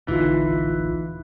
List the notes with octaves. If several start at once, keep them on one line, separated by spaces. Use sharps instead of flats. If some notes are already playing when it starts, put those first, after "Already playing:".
D1 A#1 D3 E3 D#4 F4